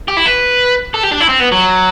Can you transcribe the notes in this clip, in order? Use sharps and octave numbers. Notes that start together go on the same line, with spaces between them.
G4
E4
B4
A4
G4
D4
E4
C4
B3
F#3